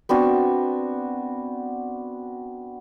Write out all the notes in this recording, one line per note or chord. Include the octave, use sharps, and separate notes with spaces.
B3 C4 D4 F#4